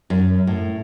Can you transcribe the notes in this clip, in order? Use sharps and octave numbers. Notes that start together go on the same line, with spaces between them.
F#2
A2